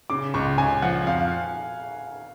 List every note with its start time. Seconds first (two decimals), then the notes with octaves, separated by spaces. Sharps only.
0.10 C#3 D6
0.34 C#2 C#6
0.58 C#2 G#5
0.82 F3 F#5
1.07 F2 F5